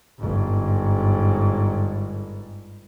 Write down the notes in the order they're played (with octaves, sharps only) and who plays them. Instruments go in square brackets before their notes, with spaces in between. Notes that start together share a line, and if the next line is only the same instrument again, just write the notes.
[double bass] G1 G#2